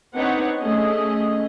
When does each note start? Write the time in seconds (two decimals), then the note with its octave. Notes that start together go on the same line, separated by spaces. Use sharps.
0.15 C4 D4 D#4 B4 C#5 F#5
0.59 A3 C#4 G#4 D#5